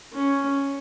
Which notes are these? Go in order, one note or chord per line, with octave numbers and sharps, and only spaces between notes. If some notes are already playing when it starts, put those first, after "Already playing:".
C#4